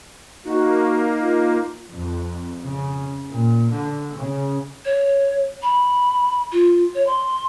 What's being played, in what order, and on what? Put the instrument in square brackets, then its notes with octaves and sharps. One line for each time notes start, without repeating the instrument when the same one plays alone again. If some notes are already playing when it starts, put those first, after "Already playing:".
[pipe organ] A#3 [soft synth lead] D#4 [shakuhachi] F#4
[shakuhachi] F4
[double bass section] F2
C#3
A#2
D3
C#3
[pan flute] C#5
B5
F4
C#5
C6